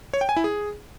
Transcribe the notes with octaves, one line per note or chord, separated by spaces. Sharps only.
C#5
G5
G#5
E4
G#4